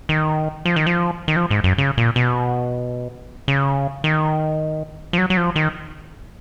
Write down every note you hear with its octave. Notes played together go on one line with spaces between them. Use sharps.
D#3
F3
D#3
F3
D#3
F3
G#2
F#2
C#3
A#2
B2
C#3
D#3
F3
F#3
F#3
F3
D#3